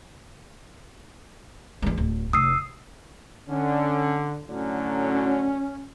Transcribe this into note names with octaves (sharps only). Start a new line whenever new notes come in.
E2 G#3
D1
F1 D#6 E6 C7
D3 C#4
A2 D3 F#3 C#4